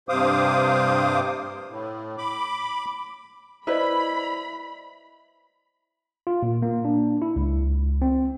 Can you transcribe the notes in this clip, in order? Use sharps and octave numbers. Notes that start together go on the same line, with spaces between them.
G2 C3 C5 F5 D6 D#6
A2
B5 D6
E4 B4 C5 D5 D#5 B5
F4
A#2
A#3
D4
E4
C#2
C4